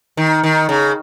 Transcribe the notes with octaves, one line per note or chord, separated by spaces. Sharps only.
D#3
D#3
C#3